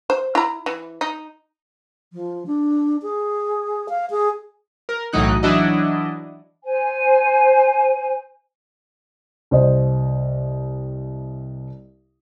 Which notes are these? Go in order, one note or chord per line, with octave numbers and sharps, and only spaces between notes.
C5
E4 A#5
E3
D#4
F3
D4
G#4
F5
G#4
A#4
B1 A2 E3 F#3 D#4 F#6
E3 F#3 D4 E4 F#4 D#5
C5 G#5
C2 C5 D#5